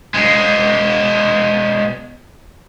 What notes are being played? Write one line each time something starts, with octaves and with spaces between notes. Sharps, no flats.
B2 G#3